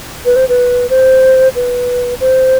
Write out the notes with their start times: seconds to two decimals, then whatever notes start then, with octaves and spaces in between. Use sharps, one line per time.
0.25 B4
0.36 C5
0.49 B4
0.90 C5
1.56 B4
2.20 C5